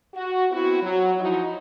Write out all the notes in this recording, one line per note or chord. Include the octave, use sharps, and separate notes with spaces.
F#4
B3 C4 E4 F#4
F#3
F3 D#4 E4 F#4